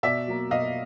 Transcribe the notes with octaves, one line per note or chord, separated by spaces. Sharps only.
B2 D5 E5
F#3 A#3
B2 D#5 F5